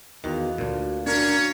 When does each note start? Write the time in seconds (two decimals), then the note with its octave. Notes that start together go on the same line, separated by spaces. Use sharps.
0.24 E2 D#3 F#4 F5
0.58 D2 A#2
1.07 A#3 C#4 D4 A#4 C#5